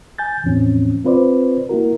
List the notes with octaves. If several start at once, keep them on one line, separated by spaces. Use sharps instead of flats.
G#5 G6 A6
E2 A2 F3 C4 C#4
C4 F4 B4 C5 D5
A#3 E4 F#4 A#4